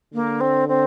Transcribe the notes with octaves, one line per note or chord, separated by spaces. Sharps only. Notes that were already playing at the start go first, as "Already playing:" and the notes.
D3 A#3
C4
C4